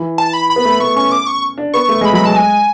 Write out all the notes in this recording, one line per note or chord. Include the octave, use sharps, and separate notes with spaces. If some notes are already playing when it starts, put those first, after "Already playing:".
Already playing: E3
A5
B5
B5
B3
A3
A3 C#6
C#4 C#6
D6
C#6
D4
B3 C#6
A3
G#3 B5
F#3 B5
G#3 A5
G#5